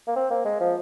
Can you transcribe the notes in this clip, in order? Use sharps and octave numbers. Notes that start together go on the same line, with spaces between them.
A#3
C4
A#3
G#3
F3